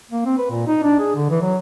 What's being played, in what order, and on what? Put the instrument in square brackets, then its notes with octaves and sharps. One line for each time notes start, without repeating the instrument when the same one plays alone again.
[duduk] A#3
C4
B4
A#2
D#4
D4
G#4
D3
E3
F#3